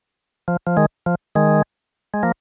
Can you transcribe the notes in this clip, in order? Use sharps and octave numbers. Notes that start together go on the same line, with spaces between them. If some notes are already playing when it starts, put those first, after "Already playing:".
F3
F3
D#3 G#3
F3
D#3 G#3
G#3
F3 A#3